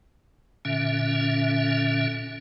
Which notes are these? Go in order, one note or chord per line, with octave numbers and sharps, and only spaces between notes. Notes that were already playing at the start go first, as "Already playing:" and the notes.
A#2 D3 C#4 E5